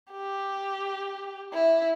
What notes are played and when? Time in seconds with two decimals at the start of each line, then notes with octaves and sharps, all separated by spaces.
0.12 G4
1.54 E4